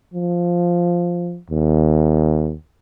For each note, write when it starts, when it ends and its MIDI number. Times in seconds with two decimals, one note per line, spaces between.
0.14 1.38 53
1.50 2.54 39